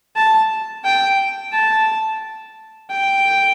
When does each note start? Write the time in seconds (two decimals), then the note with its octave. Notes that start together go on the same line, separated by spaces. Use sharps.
0.16 A5
0.85 G5
1.52 A5
2.90 G5